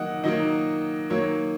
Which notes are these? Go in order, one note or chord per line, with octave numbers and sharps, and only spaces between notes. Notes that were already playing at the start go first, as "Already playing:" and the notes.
Already playing: D#3 F#3 A#3 D#5 F#5
D#3 F#3 A#3 D#5
D#3 F#3 A#3 C#5